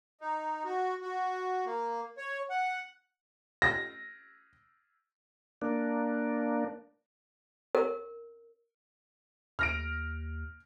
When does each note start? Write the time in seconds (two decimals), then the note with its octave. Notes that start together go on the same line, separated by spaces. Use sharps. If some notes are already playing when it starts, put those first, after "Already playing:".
0.21 D#4
0.65 F#4
1.02 F#4
1.65 A#3
2.18 C#5
2.50 F#5
3.62 A#6
5.62 A#3 D4
7.75 A#4
9.59 D#2 F6 A#6 D7